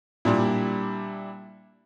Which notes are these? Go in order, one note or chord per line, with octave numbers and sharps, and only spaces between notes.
A#2 G3 D4 E4